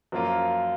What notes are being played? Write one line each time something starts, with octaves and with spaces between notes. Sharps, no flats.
F#2 F3 A#3 F4